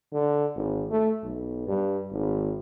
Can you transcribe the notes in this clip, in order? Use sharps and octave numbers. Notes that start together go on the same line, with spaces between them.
D3
G#1
A3
B1
G2
G#1